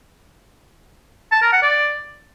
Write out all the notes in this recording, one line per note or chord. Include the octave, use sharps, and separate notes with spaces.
A5
A#4
F#5
D5